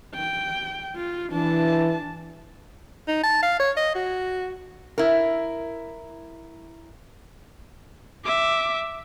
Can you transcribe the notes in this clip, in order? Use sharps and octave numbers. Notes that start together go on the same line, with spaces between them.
G5
F4
E3 D4 A5
D#4
A5
F5
C#5
D#5
F#4
E4 A#4
E5 D6